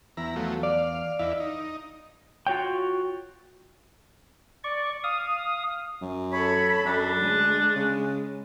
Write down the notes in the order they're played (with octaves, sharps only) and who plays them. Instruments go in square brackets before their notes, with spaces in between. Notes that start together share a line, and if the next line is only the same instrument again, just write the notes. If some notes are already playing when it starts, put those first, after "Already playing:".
[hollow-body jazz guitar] E2 [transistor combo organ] E4 A#5
[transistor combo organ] F3 F#3 A3
[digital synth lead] D5 [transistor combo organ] F5
[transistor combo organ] E2 E4 [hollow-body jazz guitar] D#5 F5
[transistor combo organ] D#4
[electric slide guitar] F4 F#4 C#5 G5
[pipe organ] D5 C#6
F5 D#6
[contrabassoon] F#2
[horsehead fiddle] A4 B5 [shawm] C#5
[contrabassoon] F#2 [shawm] D4
[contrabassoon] D2 [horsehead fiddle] G#3
[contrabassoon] C#3